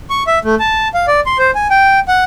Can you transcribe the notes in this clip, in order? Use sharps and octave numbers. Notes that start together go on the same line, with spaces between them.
C#6
E5
A3
A5
F5
D5
C6
C5
G#5
G5
F#5